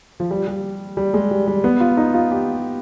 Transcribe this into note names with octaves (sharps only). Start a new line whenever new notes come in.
F3
G3
G3
G3
G#3
G3
G3
B3
F4
D#4
F4
G4